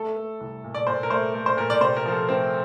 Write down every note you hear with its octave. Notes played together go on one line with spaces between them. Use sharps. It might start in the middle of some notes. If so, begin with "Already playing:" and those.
Already playing: A3 A4
A3
C2
A#2
D5
A#2 C5
A#4
A3 C5
A3
C5
A#2 A#4
D5
C3 C5
A#4
F3
A4
A3 C4